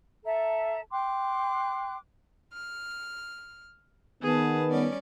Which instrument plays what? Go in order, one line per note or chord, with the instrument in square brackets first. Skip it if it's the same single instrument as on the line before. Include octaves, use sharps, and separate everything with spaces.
[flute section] A4 E5 A5 A#5
G5 C6 D6 F#6
[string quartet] F6
[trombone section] D#3 B3 [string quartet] G#4 B4 A5
[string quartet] G3 C#4 D5